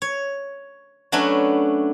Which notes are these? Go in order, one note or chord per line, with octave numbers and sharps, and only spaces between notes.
C#5
F#3 A3 C#4 D4 B4